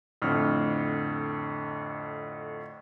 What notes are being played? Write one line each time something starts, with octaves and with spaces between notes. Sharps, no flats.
F2 A2 D3 F6